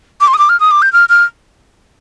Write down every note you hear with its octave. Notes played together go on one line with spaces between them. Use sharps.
D6
C6
D#6
D6
F6
D#6
D6
G6
F6
F6